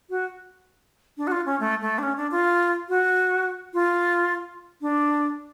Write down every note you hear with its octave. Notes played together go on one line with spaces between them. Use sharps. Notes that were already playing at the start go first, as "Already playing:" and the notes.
F#4
D4
F#4
F4
C#4
A3
A3
D4
C#4
D4
F4
F#4
F4
D4